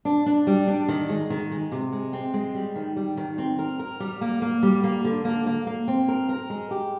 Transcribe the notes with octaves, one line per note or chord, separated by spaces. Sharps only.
D4
D4
G3
D4
D#3
G#3
D#3
G#3
C3
G#3
C4
G#3
G3
D#3
G3
D#3
C4
A#4
A#4
G3
A#3
A#3
G3
A#3
D3
A#3
A#3
A#3
C4
A#4
A#4
G#3
G4